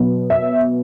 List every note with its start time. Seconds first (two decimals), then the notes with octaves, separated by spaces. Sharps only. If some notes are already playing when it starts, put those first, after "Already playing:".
Already playing: B2 F#3 B3
0.30 E5